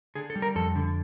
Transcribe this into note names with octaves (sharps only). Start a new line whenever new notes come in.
D3 G#4
A4
G3
A#4
F2 A4
D3